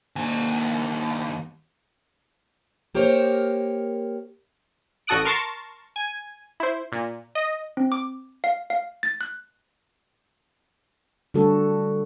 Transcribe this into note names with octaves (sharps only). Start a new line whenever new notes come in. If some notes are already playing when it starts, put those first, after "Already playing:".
D#2 G#5
A#3 G4 A#4 C5 C#5
A1 F#4 A4 D#6 F#6 D7
A#4 A5 C6 C#6 A6
G#5
E4 C5
A#2
D#5
C4
D6
F5
F5
A6
F#6
D3 G3 A3 F#4 A4